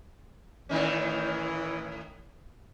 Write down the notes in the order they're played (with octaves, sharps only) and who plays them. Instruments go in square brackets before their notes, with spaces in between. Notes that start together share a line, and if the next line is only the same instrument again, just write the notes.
[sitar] A2 D#3 C#4 [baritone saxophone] E3